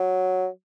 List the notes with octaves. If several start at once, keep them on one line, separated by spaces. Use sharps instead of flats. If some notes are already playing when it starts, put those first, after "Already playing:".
Already playing: F#3